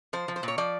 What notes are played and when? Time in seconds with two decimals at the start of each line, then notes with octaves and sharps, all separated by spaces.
0.13 F3 C5
0.28 F3
0.36 C5
0.43 A#2 C#5
0.58 F3 D5